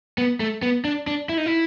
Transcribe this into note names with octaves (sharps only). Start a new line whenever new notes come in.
B3
A3
B3
D4
D4
E4
D#4
E4